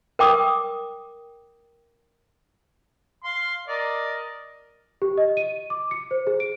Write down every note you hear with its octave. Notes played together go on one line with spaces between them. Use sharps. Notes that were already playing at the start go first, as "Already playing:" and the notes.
A#4 G5 D6 D#6
F5 C6
A#4 D5 D#5
G4
D#5
D#7
D6
C#7
C5
G#4
D7